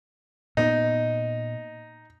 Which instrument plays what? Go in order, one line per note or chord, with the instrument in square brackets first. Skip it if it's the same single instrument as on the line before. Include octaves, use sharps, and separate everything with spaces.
[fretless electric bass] A#2 B3 [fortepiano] D#4